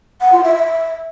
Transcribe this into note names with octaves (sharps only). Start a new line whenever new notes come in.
F#5
F4
E5
E5